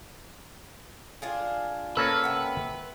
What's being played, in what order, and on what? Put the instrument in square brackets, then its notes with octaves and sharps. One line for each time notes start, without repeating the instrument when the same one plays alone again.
[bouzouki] D4 F4 G#4
[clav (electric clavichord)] A#3 C#4 A4 [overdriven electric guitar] B4 [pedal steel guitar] A5 E6
[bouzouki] C3 F#5